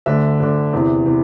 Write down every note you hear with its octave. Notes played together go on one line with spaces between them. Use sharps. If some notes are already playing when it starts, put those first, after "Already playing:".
D2 D3 E5
D2 D3
E2 C3 E3
C3 E3